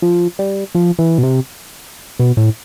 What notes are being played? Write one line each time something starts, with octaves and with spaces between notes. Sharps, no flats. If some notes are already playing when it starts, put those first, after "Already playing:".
F3
G3
F3
E3
B2
C3
B2
A2